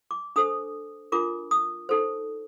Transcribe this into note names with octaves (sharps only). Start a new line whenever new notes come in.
D6
D4 A4 C5 D#6
D4 F4 A#4 D6
D#6
D#4 A4 C5